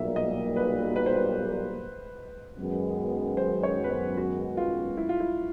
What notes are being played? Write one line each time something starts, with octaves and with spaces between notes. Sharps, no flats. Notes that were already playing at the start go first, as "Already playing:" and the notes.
Already playing: B1 A#2 G3 A#3 E5
D#5
B4
B4
C5
B4
F#2 D#3 G#3 B3
C5
C#5
B4
C5
F#4
F4
E4
F4
E4